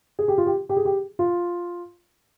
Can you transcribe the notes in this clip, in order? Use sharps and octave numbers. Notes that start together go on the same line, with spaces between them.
G#4
G4
F4
G4
G4
G#4
G4
F4